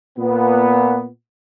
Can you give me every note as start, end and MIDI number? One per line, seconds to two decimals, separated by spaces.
0.19 1.06 46
0.19 1.06 59